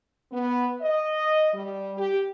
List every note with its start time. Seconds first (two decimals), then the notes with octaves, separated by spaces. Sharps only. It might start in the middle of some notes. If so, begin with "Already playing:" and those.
0.32 B3
0.82 D#5
1.53 G3
1.98 G4